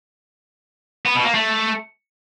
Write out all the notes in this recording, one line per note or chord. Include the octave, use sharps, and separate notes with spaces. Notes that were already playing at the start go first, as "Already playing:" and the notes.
B3
B2
A#3
A3